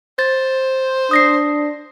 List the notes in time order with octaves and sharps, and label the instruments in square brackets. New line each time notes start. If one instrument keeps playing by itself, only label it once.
[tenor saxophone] C5 [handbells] A6
[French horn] D4 [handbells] D#6 A#6 C7